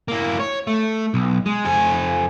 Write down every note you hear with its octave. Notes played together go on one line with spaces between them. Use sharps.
A#3 E4
C#5
A3
B1
G#3
F2 G#5